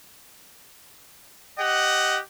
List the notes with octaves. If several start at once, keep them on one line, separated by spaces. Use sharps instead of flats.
G4 D#5 F#5